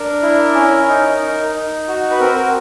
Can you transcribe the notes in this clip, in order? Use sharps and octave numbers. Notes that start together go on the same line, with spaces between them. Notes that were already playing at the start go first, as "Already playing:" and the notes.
Already playing: D4 A#4
E4
C#4
D#4
D#4
D#4
F#4
B4
C4 A#4
A#4